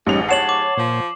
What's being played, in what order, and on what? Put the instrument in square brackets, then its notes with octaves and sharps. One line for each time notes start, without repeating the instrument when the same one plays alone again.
[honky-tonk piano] A1 F7 [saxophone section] G#2 F3 G4 [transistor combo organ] G3 C#4 D#4
[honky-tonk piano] C#5 F#5 [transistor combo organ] A5 [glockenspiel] C7 E7 F#7
[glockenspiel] D6
[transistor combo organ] A#2 [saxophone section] F3 C5